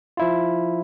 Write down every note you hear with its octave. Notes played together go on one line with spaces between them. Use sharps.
F3 E4 F4